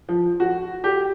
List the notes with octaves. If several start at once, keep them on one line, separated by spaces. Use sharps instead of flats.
F3
F#4
G4